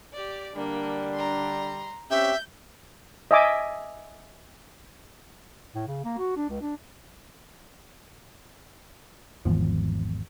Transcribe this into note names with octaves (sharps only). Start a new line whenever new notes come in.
G4 D5
D3 G3 A#3 D4
A#5 C6
C4 C#4 G4 E5 G6
D#5 E5 G#5 D6
A2
C#3
A#3
F#4
D4
C#2
D4
G#1 E2 F3